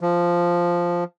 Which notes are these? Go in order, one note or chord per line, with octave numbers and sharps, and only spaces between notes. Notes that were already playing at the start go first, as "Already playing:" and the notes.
F3